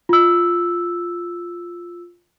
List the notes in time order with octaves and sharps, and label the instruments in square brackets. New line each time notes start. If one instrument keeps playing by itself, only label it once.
[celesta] F4 E6